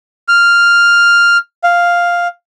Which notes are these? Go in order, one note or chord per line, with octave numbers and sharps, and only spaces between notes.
F6
F5